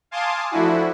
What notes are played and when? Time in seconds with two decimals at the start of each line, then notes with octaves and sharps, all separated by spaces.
0.11 F5 G#5 A5 C6 D6 D#6
0.51 F3 A3 D4 E4 F#4